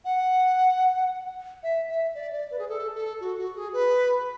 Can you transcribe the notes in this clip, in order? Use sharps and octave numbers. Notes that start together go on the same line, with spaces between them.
F#5
E5
E5
D5
D5
B4
G#4
A4
A4
F#4
F#4
G#4
B4